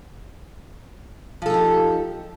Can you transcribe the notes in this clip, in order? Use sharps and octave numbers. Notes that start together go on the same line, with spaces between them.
F3 D#4 G4 A4